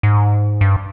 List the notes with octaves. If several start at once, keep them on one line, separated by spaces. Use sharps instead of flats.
G#2
G2